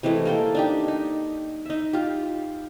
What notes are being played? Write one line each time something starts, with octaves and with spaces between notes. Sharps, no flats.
C3 E3 G#3 A3
A#3 A4 G5
D4 D#4 G4
D#4
D#4 E5
F4 G4